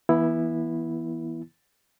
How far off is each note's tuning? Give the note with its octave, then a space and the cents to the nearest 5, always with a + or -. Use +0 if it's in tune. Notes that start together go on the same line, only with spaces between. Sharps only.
E3 +0 B3 -25 E4 +0